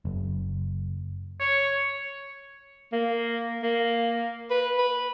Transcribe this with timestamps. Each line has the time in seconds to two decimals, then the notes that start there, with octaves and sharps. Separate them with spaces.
0.05 F#1
1.40 C#5
2.92 A#3
3.62 A#3
4.51 B4
4.78 B4